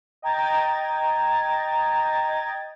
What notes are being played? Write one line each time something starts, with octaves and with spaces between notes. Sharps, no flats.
D#5 G5 A#5 G#6 A6